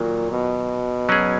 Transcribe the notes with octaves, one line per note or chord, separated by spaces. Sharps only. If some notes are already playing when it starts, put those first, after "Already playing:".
Already playing: A#2 D#3 F#3
B2
F#3 C#4 G#4